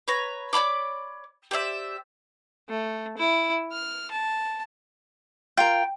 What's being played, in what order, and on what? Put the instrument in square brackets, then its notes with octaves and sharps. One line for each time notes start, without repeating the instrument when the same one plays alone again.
[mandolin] B4 C#5 A#5
C#5 D5 B5 D6
G4 C5 D5 E5
[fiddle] A3
E4
F6
A5
[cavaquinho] F4 A#4 [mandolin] G5